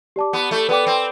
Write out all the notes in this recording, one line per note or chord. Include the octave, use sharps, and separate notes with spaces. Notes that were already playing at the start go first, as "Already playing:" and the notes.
G4 D5 A5 D6
B3
A3
B3 B4 D5 G5 D6
C4